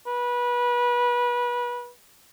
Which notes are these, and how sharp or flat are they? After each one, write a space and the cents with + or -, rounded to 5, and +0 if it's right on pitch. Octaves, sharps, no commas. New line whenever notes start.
B4 -25